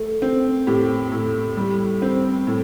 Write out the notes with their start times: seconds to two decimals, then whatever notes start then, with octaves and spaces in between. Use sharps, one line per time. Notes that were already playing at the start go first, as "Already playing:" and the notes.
Already playing: A3
0.22 C4
0.67 A2 G4
1.12 A2
1.57 G3
2.02 C4
2.47 A2